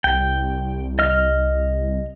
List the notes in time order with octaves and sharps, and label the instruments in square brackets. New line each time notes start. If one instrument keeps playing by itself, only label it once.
[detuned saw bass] C2 [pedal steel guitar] G5
[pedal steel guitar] D#5 F6